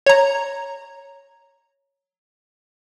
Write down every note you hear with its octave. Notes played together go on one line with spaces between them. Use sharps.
C#5 A#5